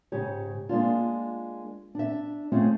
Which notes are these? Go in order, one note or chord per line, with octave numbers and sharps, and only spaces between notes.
G#2 C#3 G4 C#5
G#3 A#3 D4 F4
D4 E5
A3 C4 C#4 F4 G#4